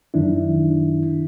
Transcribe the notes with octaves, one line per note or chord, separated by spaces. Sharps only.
F#2 D#3 D4 E4